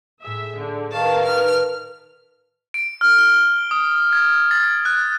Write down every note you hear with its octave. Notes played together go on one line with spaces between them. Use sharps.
A2 G#4 E5 D#6
D3
D#3 A#4 B4 D#5 F5 A5 C#6
B4 A5 F6 B6
D7
F6
G7
D#6
G#6
A6
F#6